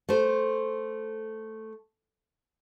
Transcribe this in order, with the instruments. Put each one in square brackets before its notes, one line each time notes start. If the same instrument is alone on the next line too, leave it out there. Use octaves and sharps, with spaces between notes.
[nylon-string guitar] A3 C5